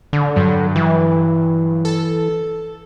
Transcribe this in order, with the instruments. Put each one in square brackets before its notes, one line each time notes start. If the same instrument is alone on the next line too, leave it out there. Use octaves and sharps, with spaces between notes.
[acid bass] D3
[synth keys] G2 F#3
[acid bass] E3
[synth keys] A4